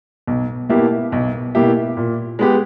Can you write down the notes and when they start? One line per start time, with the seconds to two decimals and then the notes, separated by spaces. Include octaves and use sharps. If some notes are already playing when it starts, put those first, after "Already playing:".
0.27 B1
0.69 B2 A#3 E4 G4
1.12 B1
1.55 B2 A#3 E4 G4
1.97 A#2
2.39 G#3 B3 G4